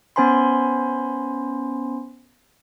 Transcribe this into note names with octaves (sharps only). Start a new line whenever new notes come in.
B3 C#4 C5 G#5 B5 C6